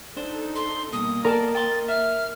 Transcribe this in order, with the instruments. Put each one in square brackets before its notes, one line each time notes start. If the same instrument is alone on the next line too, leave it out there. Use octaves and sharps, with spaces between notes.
[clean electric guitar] D4 C5 [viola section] D#4 A4
[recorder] C6
[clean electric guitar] G2 B2 [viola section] A#3 D#5 [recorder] D#6
[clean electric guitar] B3 G#5 A5 [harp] A#4 [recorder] D5
[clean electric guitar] G5 C6 [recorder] A6
[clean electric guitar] E5 [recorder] F6